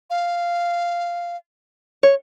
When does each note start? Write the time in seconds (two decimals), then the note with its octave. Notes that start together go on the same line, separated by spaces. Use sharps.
0.10 F5
2.03 C#5